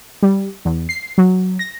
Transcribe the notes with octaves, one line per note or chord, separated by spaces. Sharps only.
G3
E2
C7
F#3
A#6